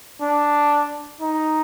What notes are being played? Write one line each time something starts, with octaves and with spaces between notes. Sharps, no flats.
D4
D#4